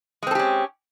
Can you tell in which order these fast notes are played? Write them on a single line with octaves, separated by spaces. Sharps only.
G#3 C4 A4 G4 C#4